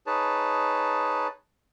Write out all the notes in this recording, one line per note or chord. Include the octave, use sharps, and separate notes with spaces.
D#4 G#4 B4 C#5 A5